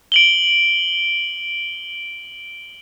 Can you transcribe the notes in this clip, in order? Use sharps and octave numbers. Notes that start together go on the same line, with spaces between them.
D7 F#7 G7